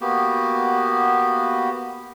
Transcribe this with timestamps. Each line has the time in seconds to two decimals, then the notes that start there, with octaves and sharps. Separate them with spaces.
0.01 A#3 B3 F#4 G4